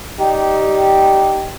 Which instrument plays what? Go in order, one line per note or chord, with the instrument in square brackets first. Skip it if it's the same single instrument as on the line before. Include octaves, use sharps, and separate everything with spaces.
[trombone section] G3 D#4 G4